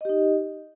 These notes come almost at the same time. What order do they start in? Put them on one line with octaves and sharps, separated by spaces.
D#5 G4 D#4